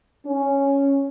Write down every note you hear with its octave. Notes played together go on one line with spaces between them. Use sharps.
C#4